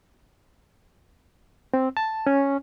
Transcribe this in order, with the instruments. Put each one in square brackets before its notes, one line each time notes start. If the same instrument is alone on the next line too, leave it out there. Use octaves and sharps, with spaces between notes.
[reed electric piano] C4
A5
C#4